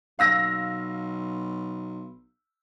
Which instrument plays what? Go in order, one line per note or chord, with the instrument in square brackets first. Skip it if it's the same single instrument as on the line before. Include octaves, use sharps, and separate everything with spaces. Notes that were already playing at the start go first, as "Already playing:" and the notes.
[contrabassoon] B1 [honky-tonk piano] F5 E6 A#6